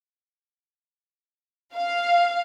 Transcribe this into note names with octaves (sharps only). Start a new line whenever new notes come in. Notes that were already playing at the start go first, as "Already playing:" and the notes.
F5